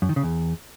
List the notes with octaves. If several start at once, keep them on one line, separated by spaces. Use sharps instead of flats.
F#2
D#3
C#3
E2